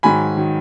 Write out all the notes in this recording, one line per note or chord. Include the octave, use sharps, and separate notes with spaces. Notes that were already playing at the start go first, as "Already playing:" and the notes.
G#2 D#3 F#3 G#5 B5
D#3 F#3